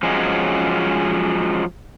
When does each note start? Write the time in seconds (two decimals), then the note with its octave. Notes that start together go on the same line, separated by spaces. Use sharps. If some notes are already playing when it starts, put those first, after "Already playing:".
0.03 F3 F#3 G#3 C#4